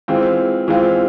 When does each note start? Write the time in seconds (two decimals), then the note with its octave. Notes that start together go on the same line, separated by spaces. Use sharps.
0.08 E3 G#3 C4 F4
0.68 E3 G#3 C4 F4